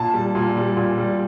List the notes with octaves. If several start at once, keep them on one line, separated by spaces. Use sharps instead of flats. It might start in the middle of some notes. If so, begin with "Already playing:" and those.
Already playing: A#2 A5
G3
A#2
G3
A#2
G3